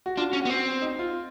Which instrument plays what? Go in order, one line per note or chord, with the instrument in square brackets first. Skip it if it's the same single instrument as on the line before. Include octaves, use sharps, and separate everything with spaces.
[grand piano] F#4
[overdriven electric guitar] D4 [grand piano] F4
[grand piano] F#4
[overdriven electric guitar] C#4
[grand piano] F#4
[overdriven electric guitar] B3
C4
[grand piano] D#4
F4